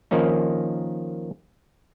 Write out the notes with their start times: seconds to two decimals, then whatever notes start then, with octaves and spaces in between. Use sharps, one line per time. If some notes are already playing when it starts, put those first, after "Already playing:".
0.11 D#3 F3 A#3 C#4 D#4